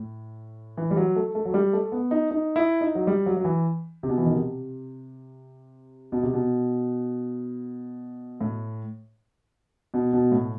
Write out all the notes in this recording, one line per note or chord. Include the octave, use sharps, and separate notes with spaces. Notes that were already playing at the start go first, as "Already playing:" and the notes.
Already playing: A2
E3
G3
F#3
A3
A3
F#3
G3
A3
B3
D#4
D#4
E4
D#4
F#3
G3
F#3
F#3
E3
C3
B2
E3
D#3
C3
B2
C3
B2
A2
B2
B2
A2